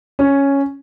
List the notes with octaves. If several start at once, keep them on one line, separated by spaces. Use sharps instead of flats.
C#4